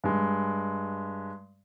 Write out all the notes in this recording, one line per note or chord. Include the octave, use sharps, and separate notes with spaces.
G2 G#3